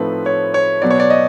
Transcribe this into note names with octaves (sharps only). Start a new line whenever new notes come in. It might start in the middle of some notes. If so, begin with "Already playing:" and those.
Already playing: A2 F3 A3 C4 D#4 B4
C#5
C#5
B2 F#3 B3 D5
C#5
D5
D#5